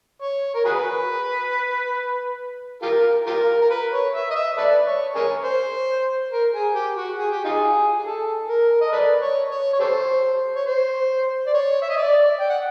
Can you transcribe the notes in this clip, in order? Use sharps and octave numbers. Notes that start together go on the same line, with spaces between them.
C#5
A#4
F#4 G#4 B4
F4 G4 A#4
F4 G4 A#4
A#4
B4
C#5
E5
D#5
E5
A4 B4 D5
C#5
G#4 A#4 C#5
C5
A#4
G#4
G4
F#4
G#4
G4
D#4 F4 G#4
G#4
A4
A#4
D#5
A4 B4 D5
C#5
C#5
C#5
G4 A4 C5
C#5
C5
D5
C#5
E5
D#5
D5
G5
F#5